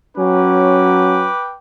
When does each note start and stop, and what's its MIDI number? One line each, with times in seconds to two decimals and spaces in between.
0.17 1.27 54
0.17 1.27 61
0.17 1.56 71
0.17 1.56 79
0.17 1.56 86